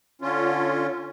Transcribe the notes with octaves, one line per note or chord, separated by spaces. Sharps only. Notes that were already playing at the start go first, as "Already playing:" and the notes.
D3 C#4 F4